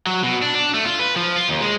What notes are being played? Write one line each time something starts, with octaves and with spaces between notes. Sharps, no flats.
F#3
B2
D4
D4
A3
F4
B4
F3
F4
D#2
G#3